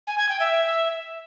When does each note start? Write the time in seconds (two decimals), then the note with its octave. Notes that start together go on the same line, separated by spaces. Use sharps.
0.07 G#5
0.18 G#6
0.29 G5
0.40 E5